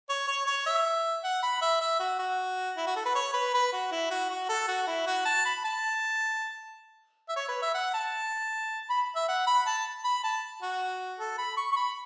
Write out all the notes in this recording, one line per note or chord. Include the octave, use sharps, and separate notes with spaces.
C#5
C#5
C#5
E5
F#5
B5
E5
E5
F#4
F#4
E4
F#4
A4
B4
C#5
B4
B4
F#4
E4
F#4
F#4
A4
F#4
E4
F#4
A5
B5
A5
E5
C#5
B4
E5
F#5
A5
B5
E5
F#5
B5
A5
B5
A5
F#4
A4
B5
C#6
C#6
B5